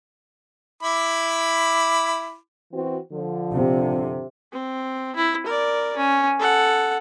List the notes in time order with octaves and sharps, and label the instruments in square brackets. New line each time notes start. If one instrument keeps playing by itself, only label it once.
[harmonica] E4 B5 D6
[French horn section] E3 C4 F#4
D3 F3
[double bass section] C3
[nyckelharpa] C4
E4
A#4 D5
C#4
A4 F#5